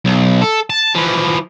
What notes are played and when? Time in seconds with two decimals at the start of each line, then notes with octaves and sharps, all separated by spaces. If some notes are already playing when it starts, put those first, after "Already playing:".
0.05 B1
0.42 A4
0.70 A5
0.95 E3 F3